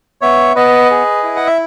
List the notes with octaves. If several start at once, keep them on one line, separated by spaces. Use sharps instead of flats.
B3 C#5 E5
B3 B4 D#5
G#4
E4
F#5
E5